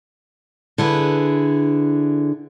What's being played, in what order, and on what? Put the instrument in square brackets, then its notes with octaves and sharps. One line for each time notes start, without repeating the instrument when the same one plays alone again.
[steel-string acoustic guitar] D3 E4 G#4 B4